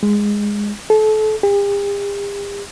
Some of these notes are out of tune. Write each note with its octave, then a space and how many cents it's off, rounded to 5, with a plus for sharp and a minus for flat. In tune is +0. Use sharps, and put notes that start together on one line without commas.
G#3 -10
A4 -30
G4 +45